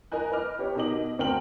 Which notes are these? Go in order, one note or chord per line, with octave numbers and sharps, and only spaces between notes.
A#4 D#5 G#5 F#6
B4 D#5 D6 F6
G4 B4 C#5
B2 D#4 A#4 D#5 D6 F#7
D2 C4 A#4 G5 F6 F#7